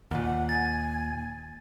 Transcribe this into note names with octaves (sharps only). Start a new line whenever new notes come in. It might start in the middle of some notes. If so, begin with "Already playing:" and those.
D#2 A#2 F#5
G#5 A6